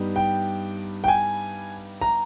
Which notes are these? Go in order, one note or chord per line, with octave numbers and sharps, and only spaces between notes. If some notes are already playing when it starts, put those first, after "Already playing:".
Already playing: G2 G3 B3 D#4
G5
G5
G#5
A#5